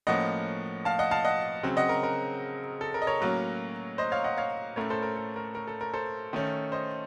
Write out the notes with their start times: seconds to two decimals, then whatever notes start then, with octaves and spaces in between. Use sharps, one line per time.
0.07 A2 F3 A#3 C#4 D#5 F#5
0.85 F5 A5
0.99 D#5 F#5
1.11 F5 A5
1.25 D#5 F#5
1.63 C#3 F#3 C4
1.77 D#5 F#5
1.89 A#4
2.03 A#4
2.81 A4
2.94 A#4
3.02 D#5
3.07 A#4 C#5
3.21 A2 F#3 A#3 C#4
3.98 C5 D#5
4.12 C#5 F5
4.24 D#5 F#5
4.37 C#5 F5
4.76 A2 A3 C#4 A#4 C#5
4.90 A4 C5
5.02 A#4
5.16 A4
5.36 A#4
5.55 A#4
5.67 A4
5.81 A#4
5.94 A4 C5
6.33 D#3 A3 C#4
6.72 C5 D#5